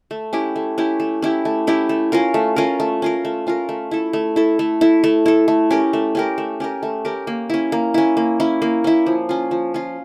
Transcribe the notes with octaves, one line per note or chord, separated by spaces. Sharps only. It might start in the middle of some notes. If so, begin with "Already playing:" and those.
A3
C#4 E4 G4
A3
C#4 E4 G4
A3
C#4 E4 G4
A3
C#4 E4 G4
A3
C#4 F4 A#4
A3
C#4 F4 A#4
A3
C#4 F4 A#4
A3
C#4 F4 A#4
A3
E4 A4
A3
E4 A4
A3
E4 A4
A3
E4 A4
A3
C#4 G4 A#4
A3
C#4 G4 A#4
A3
C#4 G4 A#4
A3
C#4 G4 A#4
A#3
C#4 E4
A#3
C#4 E4
A#3
C#4 E4
A#3
C#4 E4
F3
C#4 F4
F3
C#4 F4